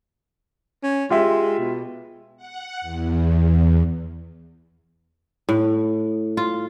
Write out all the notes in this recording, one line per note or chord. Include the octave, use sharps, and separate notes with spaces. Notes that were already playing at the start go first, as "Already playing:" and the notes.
C#4
G#3 F4 G4 E5
B2
F#5
E2
A2
F4